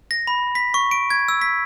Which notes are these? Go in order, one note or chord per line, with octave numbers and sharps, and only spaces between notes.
A#6
B5
B6
C#6
D7
G#6
E6
B6